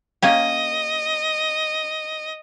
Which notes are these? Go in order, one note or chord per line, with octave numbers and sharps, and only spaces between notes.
A#3 C#4 G4 D#5